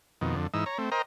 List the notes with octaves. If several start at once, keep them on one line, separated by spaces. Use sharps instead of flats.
F2 B2 D#3
F2 D3
G#2 E3 D#4 E6
C#5 A#5
A3 C4
A#4 C5 D#5 G5 A#5